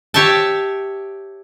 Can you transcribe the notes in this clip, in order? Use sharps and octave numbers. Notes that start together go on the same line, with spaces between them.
G4 C#5 E5 G5 A5